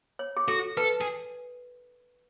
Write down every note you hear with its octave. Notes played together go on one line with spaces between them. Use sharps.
C#5
G#4
F#4 A4
A4 B4
G#4